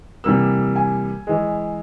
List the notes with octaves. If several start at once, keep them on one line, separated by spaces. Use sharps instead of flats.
C3 E3 G3 A#3 E6
G#5
E3 G#3